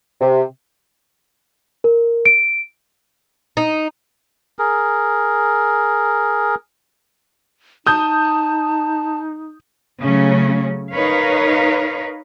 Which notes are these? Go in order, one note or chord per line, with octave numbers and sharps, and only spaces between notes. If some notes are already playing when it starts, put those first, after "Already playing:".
C3
A#4
D7
D#4
G#4 A#4
D#4 A5 D#6 G6
C#3 F#3 A3 C#4
D#4 A#4 B4 C#5 F5